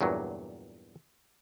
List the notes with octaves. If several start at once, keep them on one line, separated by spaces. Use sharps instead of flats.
E2 G2 A#2 F#3